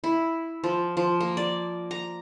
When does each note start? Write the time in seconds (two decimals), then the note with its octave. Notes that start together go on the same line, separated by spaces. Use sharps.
0.04 E4
0.64 F3
0.97 F3
1.21 A#3
1.37 D5
1.91 A#5